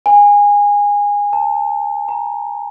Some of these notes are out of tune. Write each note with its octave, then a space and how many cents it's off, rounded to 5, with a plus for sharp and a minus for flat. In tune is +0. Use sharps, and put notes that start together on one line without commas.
G#5 -20
A5 +25
A#5 +15